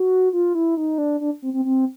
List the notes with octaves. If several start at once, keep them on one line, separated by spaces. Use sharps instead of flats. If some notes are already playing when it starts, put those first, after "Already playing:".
Already playing: F#4
F4
E4
D#4
D4
D4
C4
C4
C4